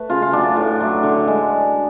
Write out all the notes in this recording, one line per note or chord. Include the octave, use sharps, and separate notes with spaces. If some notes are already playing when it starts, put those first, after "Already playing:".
Already playing: A3 B4
C#3 F4
F4
F#3 A3 D4
A2
F#3 A3
D3
G#3